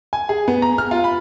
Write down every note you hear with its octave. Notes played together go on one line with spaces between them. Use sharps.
G#5
G#4
B3
A#5
F6
F4
B5